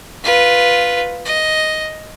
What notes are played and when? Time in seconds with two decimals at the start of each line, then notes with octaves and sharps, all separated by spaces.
0.24 F4 B4
1.25 D#5